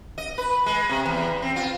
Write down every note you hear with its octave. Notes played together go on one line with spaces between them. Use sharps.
D#5
B4
G#3
C3
E2
C4
F4